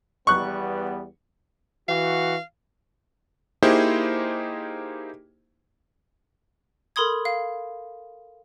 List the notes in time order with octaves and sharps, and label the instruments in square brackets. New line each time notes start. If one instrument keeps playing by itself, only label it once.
[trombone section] E2 G3 B3 [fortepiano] C#6 F#6
[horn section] E3 F#4 [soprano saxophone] F5
[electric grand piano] A#3 D#4 E4 G4 G#4 C5
[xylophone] A4 A#4 B5 C6 D#6 G#6
F5